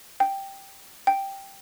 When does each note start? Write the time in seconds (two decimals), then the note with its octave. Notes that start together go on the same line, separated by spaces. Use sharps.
0.20 G5
1.07 G5